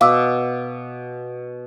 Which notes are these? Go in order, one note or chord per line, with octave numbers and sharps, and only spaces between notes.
B2 F5 D6 E6